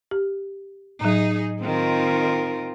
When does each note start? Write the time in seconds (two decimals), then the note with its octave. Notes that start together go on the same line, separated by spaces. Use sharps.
0.11 G4
1.01 A2 F#3 D#4 G#4
1.62 D#3 C4 F4 A#4